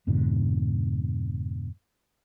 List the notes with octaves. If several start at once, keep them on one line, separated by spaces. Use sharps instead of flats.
F2 G#2 B2 D3